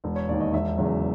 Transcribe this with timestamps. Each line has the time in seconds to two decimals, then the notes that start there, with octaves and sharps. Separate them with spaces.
0.04 E1
0.16 C#5
0.29 D#2 D#3 D5
0.40 D#5
0.54 E1 E5
0.78 E2 C#3 F#3